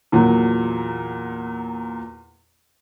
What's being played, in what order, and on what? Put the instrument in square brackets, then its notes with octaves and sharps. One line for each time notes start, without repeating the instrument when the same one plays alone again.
[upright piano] E2 A#2 F#3